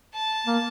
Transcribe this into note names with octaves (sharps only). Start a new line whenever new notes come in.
A5
A#3